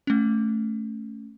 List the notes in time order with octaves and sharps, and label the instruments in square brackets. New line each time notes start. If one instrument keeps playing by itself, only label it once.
[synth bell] A3 C#4